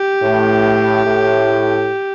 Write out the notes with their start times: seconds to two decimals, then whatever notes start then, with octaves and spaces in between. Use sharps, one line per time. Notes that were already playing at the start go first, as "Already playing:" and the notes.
Already playing: G4
0.23 A2
1.05 A2